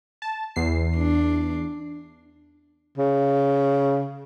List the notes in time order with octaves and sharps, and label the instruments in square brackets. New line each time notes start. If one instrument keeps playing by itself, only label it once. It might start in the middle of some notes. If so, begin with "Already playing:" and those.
[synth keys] A5
E2 C7
[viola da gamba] D4
[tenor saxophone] C#3